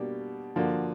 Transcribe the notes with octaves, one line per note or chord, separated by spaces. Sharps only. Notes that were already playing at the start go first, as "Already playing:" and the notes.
Already playing: B2 G3 A#3 D4 G4
D3 F3 A#3 D4 F#4